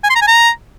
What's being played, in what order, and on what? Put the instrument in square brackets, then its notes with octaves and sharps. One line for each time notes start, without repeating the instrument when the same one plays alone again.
[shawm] G#5
C6
A#5
G#5
A#5